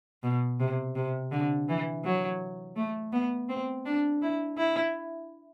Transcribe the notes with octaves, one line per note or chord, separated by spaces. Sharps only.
B2
C3
C3
D3
E3
F#3
A3
B3
C4
D4
E4
E4